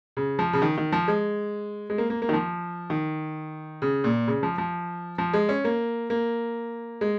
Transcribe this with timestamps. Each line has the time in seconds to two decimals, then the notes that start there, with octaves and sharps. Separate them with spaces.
0.17 C#3
0.39 F3
0.53 C#3
0.62 D#3
0.77 D#3
0.92 F3
1.08 G#3
1.90 G#3
1.98 A#3
2.10 A#3
2.22 A#3
2.29 D#3
2.33 F3
2.90 D#3
3.82 C#3
4.04 A#2
4.27 C#3
4.43 F3
4.58 F3
5.18 F3
5.33 G#3
5.49 C#4
5.64 A#3
6.10 A#3
7.01 G#3